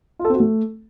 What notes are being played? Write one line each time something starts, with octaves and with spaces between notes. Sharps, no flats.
F4
A4
C4
F#4
A3